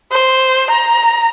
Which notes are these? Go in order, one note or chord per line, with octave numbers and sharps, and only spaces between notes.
C5
A#5